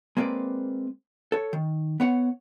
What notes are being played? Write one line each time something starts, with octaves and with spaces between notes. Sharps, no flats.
G#3 A#3 C4 B4 D5
A4 C#5
D#3
B3 C#5 F#5